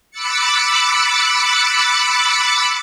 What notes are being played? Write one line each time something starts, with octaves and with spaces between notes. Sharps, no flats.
B5 D6 E6 F#6 A6 C#7